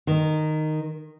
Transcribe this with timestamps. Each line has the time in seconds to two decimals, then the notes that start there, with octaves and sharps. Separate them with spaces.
0.07 D#3